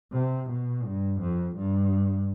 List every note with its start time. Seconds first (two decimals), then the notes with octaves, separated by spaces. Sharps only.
0.13 C3
0.50 B2
0.85 G2
1.21 F2
1.57 G2